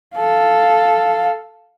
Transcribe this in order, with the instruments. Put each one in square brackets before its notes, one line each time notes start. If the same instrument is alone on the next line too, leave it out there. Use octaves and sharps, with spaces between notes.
[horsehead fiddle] A4 F5